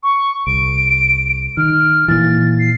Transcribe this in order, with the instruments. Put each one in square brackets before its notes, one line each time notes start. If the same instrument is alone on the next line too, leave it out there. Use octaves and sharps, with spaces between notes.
[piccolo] C#6
[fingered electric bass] C2 [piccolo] D7
[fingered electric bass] D#3 [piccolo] F6
[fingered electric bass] A#2 E3 [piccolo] A6
[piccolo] C7